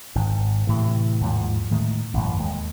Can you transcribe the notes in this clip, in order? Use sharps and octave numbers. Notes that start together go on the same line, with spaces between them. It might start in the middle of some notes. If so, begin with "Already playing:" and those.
G#1 G#2
A2 C3 E3
D#2 G#2 F3
A2 D#3 G#3
A1 F#2
D#2 G#3